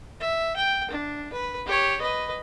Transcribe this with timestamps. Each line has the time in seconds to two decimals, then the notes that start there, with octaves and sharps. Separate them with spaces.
0.20 E5
0.56 G5
0.90 D4
1.33 B4
1.66 G4 C#5
2.01 B4 D#5